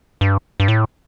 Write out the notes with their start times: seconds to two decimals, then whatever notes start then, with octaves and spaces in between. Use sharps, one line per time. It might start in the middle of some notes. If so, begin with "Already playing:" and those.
0.21 G2
0.60 G2
0.68 A2